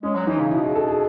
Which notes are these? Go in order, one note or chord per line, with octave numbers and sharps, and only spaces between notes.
G#3 C#4
F#3
E3 D#4
C#3
B2 E4
G#4
A4
G#4